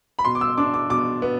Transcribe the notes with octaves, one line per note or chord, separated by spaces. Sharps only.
B5
B2 C6
D6
E6
D4 D6
D6
B2 D6
B3